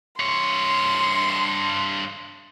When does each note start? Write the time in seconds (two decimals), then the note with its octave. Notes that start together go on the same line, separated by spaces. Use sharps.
0.20 G2 C#5 C6